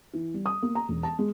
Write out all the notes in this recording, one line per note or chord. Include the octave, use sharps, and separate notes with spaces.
E3
G3
D#6
A#3
A#5
E1
A5
G#3